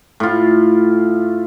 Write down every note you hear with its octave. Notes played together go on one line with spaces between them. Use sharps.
A2 F4